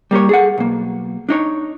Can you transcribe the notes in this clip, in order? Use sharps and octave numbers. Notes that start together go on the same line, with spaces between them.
G3 A#3 G4 C#5
G#4 A4 F#5
B1 A#3
D4 D#4 C#5